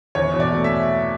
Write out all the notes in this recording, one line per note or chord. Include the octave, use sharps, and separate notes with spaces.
E2 C#5
B2
D5
A3
E5